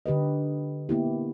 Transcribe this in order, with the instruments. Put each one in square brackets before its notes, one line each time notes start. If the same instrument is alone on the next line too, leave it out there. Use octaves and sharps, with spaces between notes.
[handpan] D3 G4 B4 D#5
A#3 B3 E4 G4